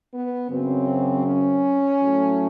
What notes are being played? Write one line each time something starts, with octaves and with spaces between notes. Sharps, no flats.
B3
F#2 C#3 F#3 C4
C#4
A2 F#3 A3